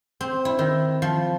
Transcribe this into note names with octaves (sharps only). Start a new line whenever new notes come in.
C4
E4
D#3
F3